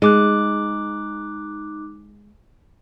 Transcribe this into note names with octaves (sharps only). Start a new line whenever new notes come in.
G#3 D#4 D6 F#6